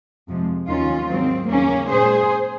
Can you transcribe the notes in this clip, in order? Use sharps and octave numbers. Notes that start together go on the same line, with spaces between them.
F2 C3 F3 G#3
D#2 D#3 F#3 C#4 F4
G#2 D#3 F#3 C4
D#2 C#3 F#3 A#3 C#4
A#2 G#3 G#4 C5